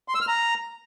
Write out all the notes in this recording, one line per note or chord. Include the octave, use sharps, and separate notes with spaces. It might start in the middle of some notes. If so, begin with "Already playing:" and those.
C6
E6
F6
A#5